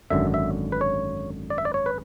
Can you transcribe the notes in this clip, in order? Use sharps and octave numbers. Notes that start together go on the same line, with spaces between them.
G#1 F#2 D3 E5
E5
B4
C#5
D5
E5
D5
C#5
B4